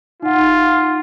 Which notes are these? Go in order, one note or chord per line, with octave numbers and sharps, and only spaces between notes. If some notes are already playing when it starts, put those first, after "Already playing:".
D#4 F4 F#5